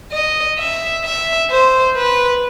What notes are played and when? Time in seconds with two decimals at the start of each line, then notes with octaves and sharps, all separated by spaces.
0.12 D#5
0.59 E5
1.05 E5
1.51 C5
1.96 B4